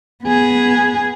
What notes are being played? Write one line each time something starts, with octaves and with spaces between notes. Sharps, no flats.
B3 G#4